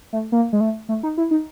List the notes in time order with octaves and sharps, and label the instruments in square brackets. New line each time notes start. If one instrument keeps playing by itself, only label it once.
[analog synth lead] A3
A#3
G#3
A3
A3
D#4
E4
D#4